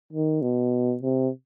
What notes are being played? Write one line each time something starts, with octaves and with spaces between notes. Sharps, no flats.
D#3
B2
C3